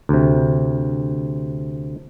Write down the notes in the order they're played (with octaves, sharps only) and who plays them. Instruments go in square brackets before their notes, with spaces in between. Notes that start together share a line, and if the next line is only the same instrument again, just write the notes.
[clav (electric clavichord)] D2 C3